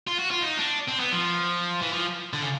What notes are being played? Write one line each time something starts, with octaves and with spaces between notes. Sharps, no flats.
F4
F#4
F4
D#4
D4
C4
B3
F3
E3
F3
D3
C#3